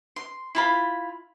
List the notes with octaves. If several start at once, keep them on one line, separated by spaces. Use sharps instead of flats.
C6
E4 F4 B5